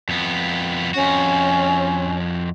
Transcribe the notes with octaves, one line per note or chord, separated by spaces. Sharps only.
F2 B3
F2 C#4 F#4